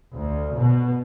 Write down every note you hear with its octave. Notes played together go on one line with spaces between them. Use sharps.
D2
B2